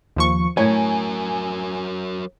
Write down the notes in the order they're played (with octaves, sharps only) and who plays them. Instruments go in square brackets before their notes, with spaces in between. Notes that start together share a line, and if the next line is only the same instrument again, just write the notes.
[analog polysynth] D#2 F3 C#6
[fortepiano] A2 C#5 [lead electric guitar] F#3 A#4 [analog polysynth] G#5